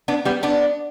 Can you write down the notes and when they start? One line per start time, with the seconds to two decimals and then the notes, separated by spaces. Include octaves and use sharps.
0.08 B3 D4
0.25 G3 B3
0.43 B3 D4